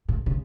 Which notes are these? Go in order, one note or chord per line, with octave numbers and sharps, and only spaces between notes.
A2
C#3